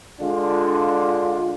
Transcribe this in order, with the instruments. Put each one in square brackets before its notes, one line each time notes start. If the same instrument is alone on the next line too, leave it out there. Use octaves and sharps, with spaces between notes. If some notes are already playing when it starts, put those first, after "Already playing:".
[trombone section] D3 G#3 D4 F4